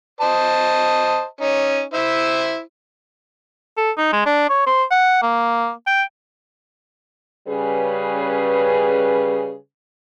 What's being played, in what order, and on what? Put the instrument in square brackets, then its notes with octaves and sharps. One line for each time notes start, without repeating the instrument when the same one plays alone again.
[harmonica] C5 D#5 A5
C#4 D#4
E4 C5 E5
[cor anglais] A4
D#4
G#3
D4
C#5
C5
F#5
A#3
G5
[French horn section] C#3 G3 C#4 G#4 B4